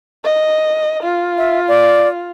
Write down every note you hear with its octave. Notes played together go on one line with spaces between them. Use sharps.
D#5
F4
E5
D5